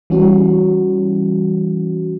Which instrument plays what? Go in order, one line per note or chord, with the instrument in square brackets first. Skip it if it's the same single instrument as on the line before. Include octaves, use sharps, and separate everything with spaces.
[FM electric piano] E3 G3 C#4 F#4